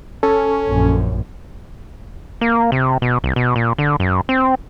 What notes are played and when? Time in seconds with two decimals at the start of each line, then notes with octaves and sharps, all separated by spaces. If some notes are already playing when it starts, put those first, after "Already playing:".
0.23 C#4 A4
0.67 A#1 F#2
2.41 A#3
2.72 C3
3.02 B2
3.24 C2
3.36 B2
3.56 A#2
3.78 D3
4.00 F#2
4.29 C4